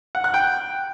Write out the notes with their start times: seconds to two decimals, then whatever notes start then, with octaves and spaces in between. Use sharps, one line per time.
0.15 F#5
0.24 F#6
0.34 G5